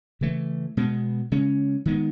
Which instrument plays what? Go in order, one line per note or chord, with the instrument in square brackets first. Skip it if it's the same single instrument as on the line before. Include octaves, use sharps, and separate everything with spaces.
[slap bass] C#3 E3 A3
B2 G#3 B3
C#3 G#3 C#4
D#3 G#3 B3